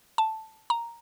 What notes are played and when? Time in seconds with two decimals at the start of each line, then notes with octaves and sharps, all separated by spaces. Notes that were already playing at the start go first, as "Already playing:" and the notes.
0.18 A5
0.70 A#5